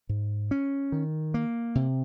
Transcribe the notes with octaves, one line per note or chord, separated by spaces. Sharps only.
G#2
C#4
D#3
A#3
C3